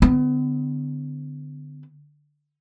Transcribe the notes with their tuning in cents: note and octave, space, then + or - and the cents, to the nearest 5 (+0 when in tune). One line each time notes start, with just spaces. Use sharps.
D3 +0 B3 +40